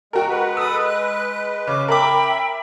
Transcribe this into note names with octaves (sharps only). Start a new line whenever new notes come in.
G#3 F#4 A#4 G5
G#3 B4 F#5
A4 B5 D#6 E6
F#6
C#3 D6
A#4 E5 G5 B5 D6